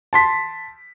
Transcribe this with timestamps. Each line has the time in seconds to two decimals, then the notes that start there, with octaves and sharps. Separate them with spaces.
0.13 A5 C6 B6